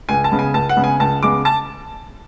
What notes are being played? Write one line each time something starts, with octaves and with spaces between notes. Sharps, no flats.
C#2 G#5
A5
C#3 G#3 B3
G#5
C#2 A5
F#5
C#3 G#3 B3
G#5
C#2 A5
C#3 G#3 B3 D6
A5